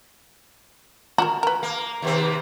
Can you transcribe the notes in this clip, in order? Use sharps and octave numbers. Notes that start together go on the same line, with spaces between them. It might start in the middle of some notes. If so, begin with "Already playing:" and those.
F#4 G4 A#4 A#5
A#4 B4
A#3
D#2 C3 C4